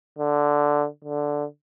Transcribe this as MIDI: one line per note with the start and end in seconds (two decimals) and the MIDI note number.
0.19 0.87 50
1.04 1.44 50